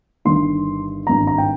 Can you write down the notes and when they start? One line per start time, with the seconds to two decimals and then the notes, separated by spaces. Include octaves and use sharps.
0.25 G1 G2 D#3 C6
1.06 G#1 G2 D#3 A#5
1.27 A#5
1.38 G5